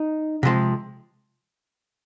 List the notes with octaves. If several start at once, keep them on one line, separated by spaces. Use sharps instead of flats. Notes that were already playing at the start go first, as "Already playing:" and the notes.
Already playing: D#4
C3 F3 G#3